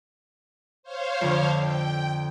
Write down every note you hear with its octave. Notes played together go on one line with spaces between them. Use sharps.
C5 C#5 F5
F2 D3
G5